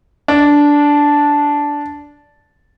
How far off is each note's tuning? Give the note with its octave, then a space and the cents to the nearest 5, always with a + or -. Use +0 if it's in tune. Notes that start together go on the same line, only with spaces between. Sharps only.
D4 -10